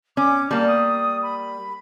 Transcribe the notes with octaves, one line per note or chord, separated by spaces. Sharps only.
C#4 D6
G3 A#3 A5
D#6
B5